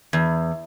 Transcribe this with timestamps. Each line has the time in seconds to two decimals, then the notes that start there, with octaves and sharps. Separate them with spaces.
0.13 E2